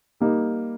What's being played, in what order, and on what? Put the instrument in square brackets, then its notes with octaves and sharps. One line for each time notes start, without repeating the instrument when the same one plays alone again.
[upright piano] G3 A#3 D#4